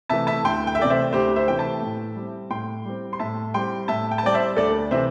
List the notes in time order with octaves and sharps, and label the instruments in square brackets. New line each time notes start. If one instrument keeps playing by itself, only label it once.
[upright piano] C3 E3 A3 E5 A5
E5 A5
D2 G5 C6
G5
E5
C3 E3 A3 D5 G5
C5 E5
D2 G4 C5
C5 E5
C3 E3 A3 G5
E5 A5
A2
G3 C4
A2 G5 C6
G3 C4
C6
A2 E5 A5
G3 C4 G5 C6
A2 E5 A5
G5
A5
G3 C4 D5 G5
C5 E5
D2 A4 D5
C3 E3 C5 E5